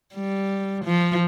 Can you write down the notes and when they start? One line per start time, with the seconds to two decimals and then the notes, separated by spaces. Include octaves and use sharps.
0.15 G3
0.84 F3